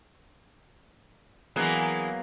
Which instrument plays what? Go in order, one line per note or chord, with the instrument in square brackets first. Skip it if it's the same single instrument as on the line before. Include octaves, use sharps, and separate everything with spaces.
[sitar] E3 G#3 G#4 [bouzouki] F#3 A#3 B3